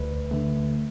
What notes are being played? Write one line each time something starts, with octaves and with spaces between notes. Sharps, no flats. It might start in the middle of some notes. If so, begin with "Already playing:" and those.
Already playing: D2 B4
D3 A3